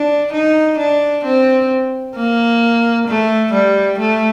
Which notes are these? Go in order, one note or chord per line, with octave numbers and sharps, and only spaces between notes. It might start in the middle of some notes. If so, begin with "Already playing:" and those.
Already playing: D4
D#4
D4
C4
A#3
A3
G3
A3